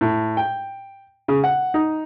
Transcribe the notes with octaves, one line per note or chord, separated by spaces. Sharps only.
A2
G5
C#3
F#5
D#4